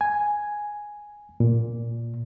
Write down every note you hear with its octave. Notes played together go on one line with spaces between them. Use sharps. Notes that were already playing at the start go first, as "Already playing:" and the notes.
G#5
A#2